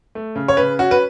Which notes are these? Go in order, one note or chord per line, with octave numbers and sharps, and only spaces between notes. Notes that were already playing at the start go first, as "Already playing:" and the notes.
A3
C#3
C#5
C#3 B4
C#4 F#4
B4